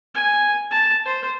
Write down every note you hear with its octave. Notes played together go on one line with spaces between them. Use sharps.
G#5
A5
C5